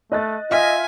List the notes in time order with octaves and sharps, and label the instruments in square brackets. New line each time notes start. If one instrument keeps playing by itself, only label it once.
[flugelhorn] A3 [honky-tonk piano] D#5 F#6 A6
[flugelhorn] F4 [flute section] D#5 [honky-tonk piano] E5 F6 B6 [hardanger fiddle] G#5